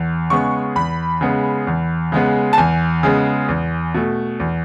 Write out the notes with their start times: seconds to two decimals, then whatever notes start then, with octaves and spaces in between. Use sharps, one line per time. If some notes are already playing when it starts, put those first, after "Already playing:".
Already playing: E2
0.30 C#3 G#3 B3 C#6
0.75 E2 B5
1.21 C#3 G#3 B3
1.67 E2
2.12 C#3 G#3 B3
2.53 A5
2.58 E2 G#5
3.03 C#3 G#3 B3
3.49 E2
3.94 B2 A3
4.40 E2